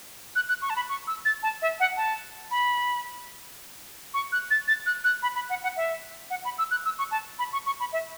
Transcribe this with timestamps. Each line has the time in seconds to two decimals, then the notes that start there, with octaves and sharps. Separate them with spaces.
0.36 F#6
0.49 F#6
0.62 C#6
0.70 A5
0.76 B5
0.89 C#6
1.07 E6
1.25 A6
1.43 A5
1.62 E5
1.80 F#5
1.97 A5
2.51 B5
4.14 C#6
4.32 F#6
4.51 A6
4.68 A6
4.86 F#6
5.04 F#6
5.23 B5
5.35 B5
5.50 F#5
5.63 F#5
5.77 E5
6.30 F#5
6.45 B5
6.58 E6
6.71 F#6
6.85 E6
6.99 C#6
7.11 A5
7.39 B5
7.53 C#6
7.66 C#6
7.80 B5
7.93 E5